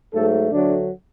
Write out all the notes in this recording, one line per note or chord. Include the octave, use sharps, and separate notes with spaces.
G#2 F#3 A3 A4
D2 D3 F#3 A3 D4